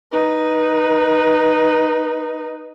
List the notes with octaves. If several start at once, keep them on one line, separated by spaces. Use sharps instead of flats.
D#4 B4